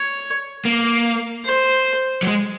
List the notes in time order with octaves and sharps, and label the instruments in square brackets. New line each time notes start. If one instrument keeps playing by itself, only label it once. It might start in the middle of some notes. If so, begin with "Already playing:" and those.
Already playing: [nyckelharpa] C#5
[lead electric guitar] A#3
[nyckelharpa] C5
[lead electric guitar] F#3
G#3